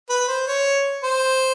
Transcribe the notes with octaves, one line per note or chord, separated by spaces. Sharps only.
B4
C5
C#5
C5